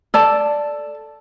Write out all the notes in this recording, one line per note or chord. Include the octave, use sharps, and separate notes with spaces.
A4 D5 A5